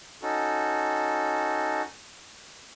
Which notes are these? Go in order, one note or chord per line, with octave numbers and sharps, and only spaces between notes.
C#4 D#4 F#4 A4